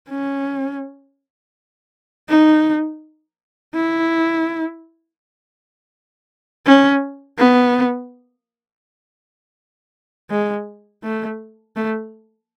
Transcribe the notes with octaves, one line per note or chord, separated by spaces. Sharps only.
C#4
D#4
E4
C#4
B3
G#3
A3
A3